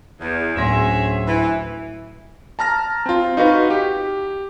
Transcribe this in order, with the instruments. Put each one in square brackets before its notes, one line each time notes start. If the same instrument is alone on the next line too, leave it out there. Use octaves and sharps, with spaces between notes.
[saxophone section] E2
[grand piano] D1 C6 A#6 [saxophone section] C#4 G#4 E5
[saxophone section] E3
[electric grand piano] A5 A#5 F6 A#6
C4 F4
D#4 F#4 B4 F5
G4